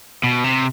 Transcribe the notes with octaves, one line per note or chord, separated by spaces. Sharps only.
B2
C3